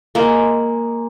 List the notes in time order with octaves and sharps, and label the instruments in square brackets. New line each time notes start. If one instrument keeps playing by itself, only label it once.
[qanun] G#3 A#3